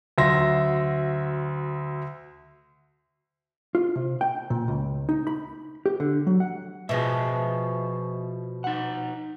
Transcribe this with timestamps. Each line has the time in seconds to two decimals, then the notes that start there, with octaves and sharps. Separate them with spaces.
0.18 D2 F#3 E5 C6 A#6
3.75 F4
3.96 C3
4.21 G5
4.50 A#2
4.68 C#2
5.09 D#4
5.27 B5
5.86 G4
6.00 D3
6.27 F#3
6.40 F#5
6.89 B2 F3 G#4 D#5 E5
8.64 D#4 F#5